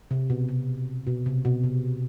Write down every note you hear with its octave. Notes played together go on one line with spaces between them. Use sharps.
C3
B2
C3
B2
C3
B2
C3